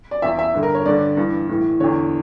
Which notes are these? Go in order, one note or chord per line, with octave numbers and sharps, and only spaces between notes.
D5
E2 E3 E5
E5
G2 D3
A#4
C#5
G2 D3 D5
G2 E3
A2 E3
E2 D3 C#5